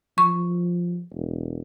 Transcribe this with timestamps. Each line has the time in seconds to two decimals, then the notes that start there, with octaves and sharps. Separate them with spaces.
0.18 F3 C#6
1.13 E1